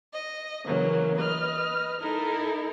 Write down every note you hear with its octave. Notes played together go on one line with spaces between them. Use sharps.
D#5
C#3 E3 F#3 A#3 C#4
B4 D#5 F6
D#4 E4 A4 A#4